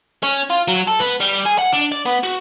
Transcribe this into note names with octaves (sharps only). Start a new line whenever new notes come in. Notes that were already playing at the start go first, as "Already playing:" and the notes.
C#4
F4
F#3
A4
B3
G3
G#4
F#5
D4
D5
B3
F#4